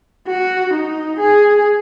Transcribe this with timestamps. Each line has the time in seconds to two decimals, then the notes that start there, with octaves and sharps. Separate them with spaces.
0.28 F#4
0.74 D#4
1.19 G#4